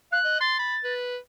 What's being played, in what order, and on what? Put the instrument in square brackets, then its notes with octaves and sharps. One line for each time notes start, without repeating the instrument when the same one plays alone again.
[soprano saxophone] F5 [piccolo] F#6
[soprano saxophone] D#5
[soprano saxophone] C6 [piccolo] A6
[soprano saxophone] B5
B4